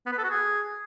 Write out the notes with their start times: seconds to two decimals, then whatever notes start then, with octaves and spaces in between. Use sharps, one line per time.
0.06 B3
0.12 B4
0.18 A4
0.24 F#4
0.30 G#4